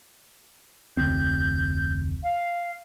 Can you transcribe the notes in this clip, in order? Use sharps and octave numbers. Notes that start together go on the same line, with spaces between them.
F1 D2 C4 G6
F5